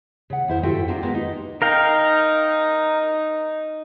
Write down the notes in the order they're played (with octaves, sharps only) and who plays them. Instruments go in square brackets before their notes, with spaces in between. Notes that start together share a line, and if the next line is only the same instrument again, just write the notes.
[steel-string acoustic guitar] C#3 F#5
F2 E4 C5 F5
G2 F4 F#4 A4 E5 G5
C4 D4 F4 G#4 A#4
G#3 A#3 B3 F4
D#4
[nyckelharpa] D#4 [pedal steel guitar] A#4 F5 G5